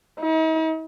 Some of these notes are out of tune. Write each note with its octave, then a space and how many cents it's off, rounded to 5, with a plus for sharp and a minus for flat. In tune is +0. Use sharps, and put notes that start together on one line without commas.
D#4 +45